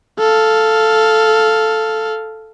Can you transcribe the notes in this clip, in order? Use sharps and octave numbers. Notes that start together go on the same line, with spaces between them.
A4 F5